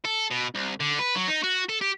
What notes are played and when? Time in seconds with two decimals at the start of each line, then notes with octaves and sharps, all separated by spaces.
0.05 A4
0.31 B2
0.55 C2
0.80 D3
0.99 B4
1.15 F#3
1.28 D#4
1.44 F#4
1.69 A4
1.81 G4